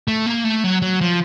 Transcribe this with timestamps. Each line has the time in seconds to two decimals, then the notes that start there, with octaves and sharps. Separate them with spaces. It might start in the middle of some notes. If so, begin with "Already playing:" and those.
0.08 A3
0.26 A#3
0.44 A3
0.64 F#3
0.82 F#3
1.01 F3